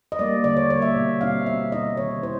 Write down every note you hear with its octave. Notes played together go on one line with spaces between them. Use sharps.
D#5
G3 A#3 D5
D3 D5
C#5
G3 A#3 C#5
E5
B2
G3 C4 D#4 F5
B2 E5
G3 C4 D#4 D#5
D#3 C#5
C4 E4 C5